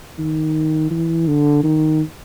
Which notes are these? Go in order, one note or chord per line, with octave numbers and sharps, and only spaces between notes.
D#3
E3
D3
D#3